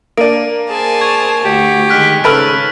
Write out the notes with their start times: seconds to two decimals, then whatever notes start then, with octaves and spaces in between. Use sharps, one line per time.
0.17 A#3 D4 D7 D#7
0.70 G#4 C5 G#5 A5
1.01 C#6 G#6 F7
1.44 D2 F#4 G4
1.89 D#3 G#3 F6 F#6 B6
2.24 G#2 C#3 A4 B4 E6 F6 D7